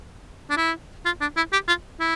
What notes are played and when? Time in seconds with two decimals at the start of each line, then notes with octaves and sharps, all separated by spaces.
0.50 D4
0.57 E4
1.06 F4
1.21 D4
1.37 E4
1.53 G4
1.68 F4
2.00 E4